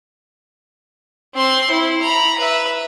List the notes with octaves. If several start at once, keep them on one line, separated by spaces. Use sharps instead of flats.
C4 C6
E4
A#5 B5
B4 E5